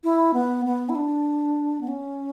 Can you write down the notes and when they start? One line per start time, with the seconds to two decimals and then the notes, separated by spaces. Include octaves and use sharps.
0.04 E4
0.34 B3
0.65 B3
0.89 E4
0.95 D4
1.81 B3
1.88 C#4